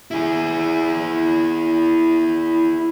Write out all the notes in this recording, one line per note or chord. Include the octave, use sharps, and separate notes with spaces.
E4 G#4